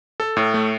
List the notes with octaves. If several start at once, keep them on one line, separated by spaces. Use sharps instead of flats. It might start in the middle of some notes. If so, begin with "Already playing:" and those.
A4
A2
A3